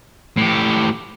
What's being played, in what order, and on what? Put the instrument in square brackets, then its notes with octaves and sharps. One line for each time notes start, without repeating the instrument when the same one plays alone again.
[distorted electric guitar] A2 G4